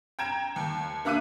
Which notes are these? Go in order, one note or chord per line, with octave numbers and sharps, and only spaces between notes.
G5 A#5 G#6 D7 E7
D#2
A#3 D4 E5 D6 F#6 D#7